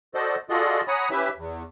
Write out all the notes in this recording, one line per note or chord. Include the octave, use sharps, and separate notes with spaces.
F#4 A4 C5 D5 D#5
F4 F#4 G#4 A4 D5 D#5
C#5 F#5 G#5 A#5 B5 D#6
C#4 E4 G4 B4 E5
E2